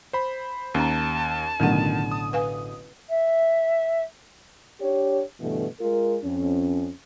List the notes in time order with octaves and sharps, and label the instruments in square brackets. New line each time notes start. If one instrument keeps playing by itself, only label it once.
[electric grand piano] C5 B5
[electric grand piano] D#2 [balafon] C#4 A#5 [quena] A5
[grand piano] A1 B2 D3 [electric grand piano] D#3 D#7 [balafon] F#3 A3 F#5
[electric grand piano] D#6
[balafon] B4 F5 G#5
[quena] E5
[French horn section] D4 G4 C#5
G2 B2 D3 E3 A3
G#3 F4 A#4
F2 C#4